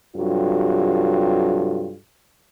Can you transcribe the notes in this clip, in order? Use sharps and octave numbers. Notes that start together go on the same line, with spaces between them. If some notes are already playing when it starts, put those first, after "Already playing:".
G2 C3 F#3 F4 A4